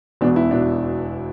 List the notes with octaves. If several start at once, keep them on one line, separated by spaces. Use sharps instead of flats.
E1 E2 B2 B3 D4
E4
B2 B3 D4